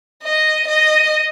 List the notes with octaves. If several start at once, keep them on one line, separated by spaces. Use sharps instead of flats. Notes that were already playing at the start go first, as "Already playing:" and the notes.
D#5
D#5